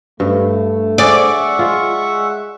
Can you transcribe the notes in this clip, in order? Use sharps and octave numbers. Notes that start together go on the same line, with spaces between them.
G2 A3
G#4 D5 E5 F#5 C#6
G#3 F4